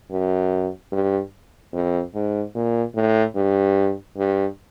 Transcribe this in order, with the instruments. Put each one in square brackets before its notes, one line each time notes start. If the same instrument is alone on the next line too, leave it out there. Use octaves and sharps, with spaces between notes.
[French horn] F#2
G2
F2
G#2
A#2
A2
G2
G2